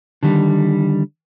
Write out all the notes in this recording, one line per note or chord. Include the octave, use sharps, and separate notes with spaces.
D3 D#3 G3